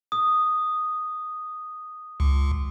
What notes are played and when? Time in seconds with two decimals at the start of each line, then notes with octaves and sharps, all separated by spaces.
0.12 D#6
2.20 C#2